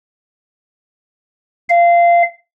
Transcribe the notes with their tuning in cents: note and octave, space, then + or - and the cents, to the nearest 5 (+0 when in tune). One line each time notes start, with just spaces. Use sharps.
F5 -20